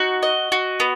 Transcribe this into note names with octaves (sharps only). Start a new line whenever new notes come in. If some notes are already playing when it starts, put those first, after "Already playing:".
Already playing: D#4 F#4
D#5
F#4
B3